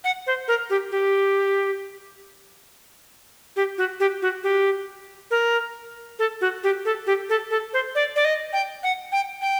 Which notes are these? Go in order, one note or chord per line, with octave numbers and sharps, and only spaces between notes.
F#5
C5
A#4
G4
G4
G4
F#4
G4
F#4
G4
A#4
A4
F#4
G4
A4
G4
A4
A4
C5
D5
D5
D#5
G5
F#5
G5
G5